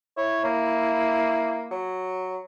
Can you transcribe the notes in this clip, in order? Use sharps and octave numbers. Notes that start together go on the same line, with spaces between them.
E4 C#5
A#3
F#3